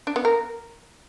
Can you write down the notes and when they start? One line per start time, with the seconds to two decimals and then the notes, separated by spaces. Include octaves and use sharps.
0.07 D4
0.16 B3
0.25 A#4